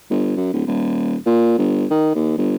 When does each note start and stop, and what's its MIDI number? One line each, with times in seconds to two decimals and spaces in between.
0.10 0.35 31
0.36 0.53 42
0.53 0.61 26
0.66 1.15 27
1.26 1.55 46
1.58 1.85 31
1.90 2.11 51
2.15 2.36 39
2.38 2.56 31